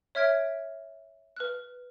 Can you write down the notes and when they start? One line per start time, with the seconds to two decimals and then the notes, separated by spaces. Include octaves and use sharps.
0.15 C#5 E5 F6 G#6 B6 D7
1.36 B4 F6 F#6